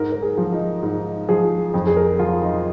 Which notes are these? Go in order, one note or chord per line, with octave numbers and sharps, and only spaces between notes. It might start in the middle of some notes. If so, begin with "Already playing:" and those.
Already playing: G#2 A#4
A#4
G#4
F3
D#4
G#2 D#4
F3 G#4
F2
G#4
A#4
F3 F4
D#4